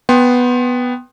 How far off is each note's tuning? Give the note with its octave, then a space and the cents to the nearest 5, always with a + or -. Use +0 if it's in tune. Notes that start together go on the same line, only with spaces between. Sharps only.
B3 +0 G5 +0 C6 +20